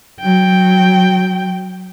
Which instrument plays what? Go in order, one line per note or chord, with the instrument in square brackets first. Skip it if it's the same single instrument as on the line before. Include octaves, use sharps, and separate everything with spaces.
[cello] F#3 G5